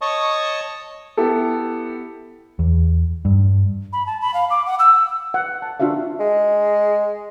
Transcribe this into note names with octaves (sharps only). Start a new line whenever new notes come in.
C#5 D#5 A5 C#6 D#6
B3 E4 G4 A4
E2
G2
B5
A5
B5
F5
D6
F#5
E6
F#5
A5
D4 F4 F#4 E5 F5
G#3